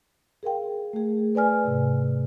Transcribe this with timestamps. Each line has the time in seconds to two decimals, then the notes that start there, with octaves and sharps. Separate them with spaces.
0.43 G#4 A#4 F5 G5
0.93 A3 G#4
1.35 B4 D5 G#5 F6
1.64 G#2 C3